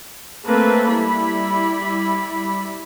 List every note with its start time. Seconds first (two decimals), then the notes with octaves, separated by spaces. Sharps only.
0.48 A3 A#3 C4 A4 B4
0.93 G3 E4 B5